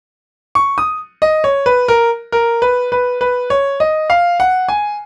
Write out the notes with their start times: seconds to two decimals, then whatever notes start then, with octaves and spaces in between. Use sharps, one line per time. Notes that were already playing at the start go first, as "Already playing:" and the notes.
0.55 C#6
0.78 D#6
1.22 D#5
1.44 C#5
1.66 B4
1.88 A#4
2.32 A#4
2.62 B4
2.92 B4
3.21 B4
3.50 C#5
3.80 D#5
4.10 F5
4.40 F#5
4.68 G#5